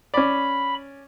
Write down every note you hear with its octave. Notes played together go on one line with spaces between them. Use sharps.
C#4 D5 B5